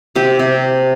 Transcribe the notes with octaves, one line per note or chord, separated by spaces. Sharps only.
C3 G4
C3